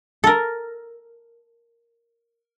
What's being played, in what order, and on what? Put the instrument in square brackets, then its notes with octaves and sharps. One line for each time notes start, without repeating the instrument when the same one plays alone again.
[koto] A4 A#4